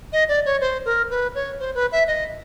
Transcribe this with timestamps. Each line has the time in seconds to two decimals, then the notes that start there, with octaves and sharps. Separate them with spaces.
0.13 D#5
0.29 D5
0.45 C#5
0.61 C5
0.85 A#4
1.10 B4
1.35 C#5
1.59 C5
1.75 B4
1.92 E5
2.07 D#5